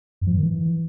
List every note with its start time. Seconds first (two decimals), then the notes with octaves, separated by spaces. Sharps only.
0.21 F#2
0.27 F3
0.32 G#2
0.37 D#3
0.43 E3